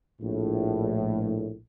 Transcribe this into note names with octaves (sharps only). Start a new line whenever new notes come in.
A#1 A2